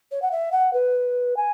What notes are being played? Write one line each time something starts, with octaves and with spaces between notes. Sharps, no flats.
C#5
F#5
E5
F#5
B4
G#5